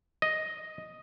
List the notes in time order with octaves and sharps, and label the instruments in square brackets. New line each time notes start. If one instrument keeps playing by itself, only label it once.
[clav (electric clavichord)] D#5